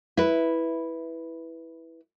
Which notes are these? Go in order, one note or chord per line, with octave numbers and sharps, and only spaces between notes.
E4 B4